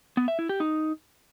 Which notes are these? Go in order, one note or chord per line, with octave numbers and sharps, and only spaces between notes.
B3
E5
E4
G4
D#4